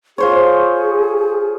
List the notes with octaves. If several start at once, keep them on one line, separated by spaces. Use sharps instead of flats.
F4 G#4 C5 C#5